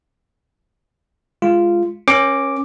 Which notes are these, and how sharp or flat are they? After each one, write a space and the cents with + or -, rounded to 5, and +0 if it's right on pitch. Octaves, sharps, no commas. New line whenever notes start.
G#3 +0 F4 -10
C#4 -15 A#4 +30 D6 +0